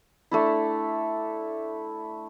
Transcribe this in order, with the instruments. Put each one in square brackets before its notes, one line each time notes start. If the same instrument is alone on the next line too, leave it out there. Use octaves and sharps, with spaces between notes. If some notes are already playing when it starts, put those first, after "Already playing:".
[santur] A3 D4 E4